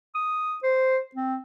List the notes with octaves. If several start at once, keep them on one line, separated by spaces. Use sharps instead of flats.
D#6
C5
C4